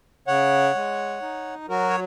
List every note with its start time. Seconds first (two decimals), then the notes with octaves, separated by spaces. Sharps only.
0.27 C#3 C#5 F#5
0.75 G#3
1.22 D#4
1.68 F#3 F#4 A#4
1.90 C#5